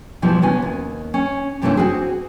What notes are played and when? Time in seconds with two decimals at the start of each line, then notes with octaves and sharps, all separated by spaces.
0.22 G#2 B2 E3 F3 G3
0.42 C3 B3 C#4 G#5
0.62 D#2
1.14 C#4
1.62 G2 C3 E3 G#3 A3 C#4
1.77 C4 F#4 G#4